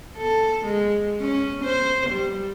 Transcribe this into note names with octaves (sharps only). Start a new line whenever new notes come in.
A4
G#3
C#4
C5
G3